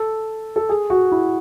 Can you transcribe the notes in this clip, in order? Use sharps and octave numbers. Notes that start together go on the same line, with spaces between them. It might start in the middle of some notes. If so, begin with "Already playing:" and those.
Already playing: A4
A4
G#4
F#4
E4